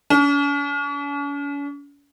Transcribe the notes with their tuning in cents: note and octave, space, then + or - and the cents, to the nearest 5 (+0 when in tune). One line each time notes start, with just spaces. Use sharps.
C#4 +45